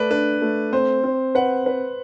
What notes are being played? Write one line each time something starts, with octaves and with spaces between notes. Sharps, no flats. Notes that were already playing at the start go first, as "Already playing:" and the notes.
Already playing: A3 B4 D5
D4 B4
A3
C4 C5
C4
B4 F#5
B4